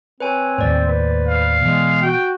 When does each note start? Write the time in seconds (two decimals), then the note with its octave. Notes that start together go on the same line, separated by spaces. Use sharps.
0.20 C4 B4 C#5 G#5
0.58 D#2 A2 C5 D5
0.88 B4
1.28 F5
1.61 B2 E3 G#3
2.02 F#4 G5